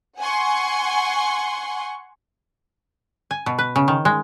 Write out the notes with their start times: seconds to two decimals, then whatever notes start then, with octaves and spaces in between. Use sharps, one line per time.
0.20 F#5 G#5 C6 C#6
3.31 G#5
3.46 B2
3.58 B4
3.76 C#3
3.88 D#3
4.05 G#3